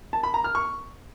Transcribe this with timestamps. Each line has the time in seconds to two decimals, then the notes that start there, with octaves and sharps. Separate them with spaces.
0.13 A5
0.23 B5
0.34 A#5
0.44 F6
0.55 C#6